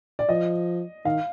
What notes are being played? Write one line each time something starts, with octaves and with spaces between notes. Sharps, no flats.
D5
F3 D#5
D#3 F5